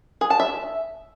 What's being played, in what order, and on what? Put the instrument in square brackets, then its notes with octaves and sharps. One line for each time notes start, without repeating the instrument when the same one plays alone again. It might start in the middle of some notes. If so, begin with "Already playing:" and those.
[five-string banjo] G#4
A5
E5